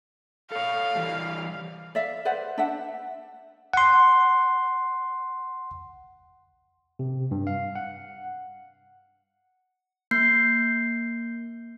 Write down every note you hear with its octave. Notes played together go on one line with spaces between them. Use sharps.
A4 C#5 F5
E3 G3
D5 E5 F5
B4 C5 D5 F#5
D4 E5 F#5
F#5 C6
C3
G2
F5
F#5
A#3 G6 C7